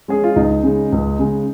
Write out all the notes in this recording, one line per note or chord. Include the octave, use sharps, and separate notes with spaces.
G#3 C#4 G#4
F4
C#2 D#4
C#3 G#3
C#2
C#3 G#3